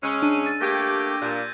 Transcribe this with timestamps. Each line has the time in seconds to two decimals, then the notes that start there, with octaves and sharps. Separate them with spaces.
0.03 C#3 G#3 C#4 E6 F#6
0.23 D4 D#7
0.46 A6
0.61 A3 A#3 G4 G#6 A#6
1.22 A#2 F#6 G6